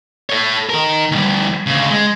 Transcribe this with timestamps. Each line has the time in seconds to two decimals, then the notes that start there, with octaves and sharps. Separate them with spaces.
0.30 A4 C#5
0.69 D#3 A#4
1.11 D2 G3
1.66 D2 C#3
1.91 G#3